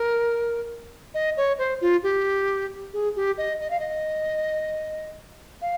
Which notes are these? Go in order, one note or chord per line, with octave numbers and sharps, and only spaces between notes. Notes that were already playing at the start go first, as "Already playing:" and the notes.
Already playing: A#4
D#5
C#5
C5
F4
G4
G#4
G4
D#5
D#5
F5
D#5
F5